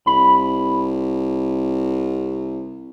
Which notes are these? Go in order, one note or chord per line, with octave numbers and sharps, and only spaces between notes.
C2 B5